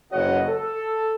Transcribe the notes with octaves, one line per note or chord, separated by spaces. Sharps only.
F#1 C#2 F#4 C#5 D#5 F#5
A4